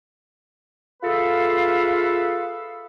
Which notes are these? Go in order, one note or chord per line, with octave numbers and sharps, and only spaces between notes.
F4 G#4 A4 B4 E5 F5